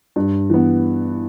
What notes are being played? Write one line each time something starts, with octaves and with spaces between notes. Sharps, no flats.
G2
E3 B3